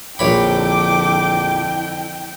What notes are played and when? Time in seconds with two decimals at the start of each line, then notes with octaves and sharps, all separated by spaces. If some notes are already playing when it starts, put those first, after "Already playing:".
0.19 A#1 F2 D3 E4 C#5 G5 B5 D6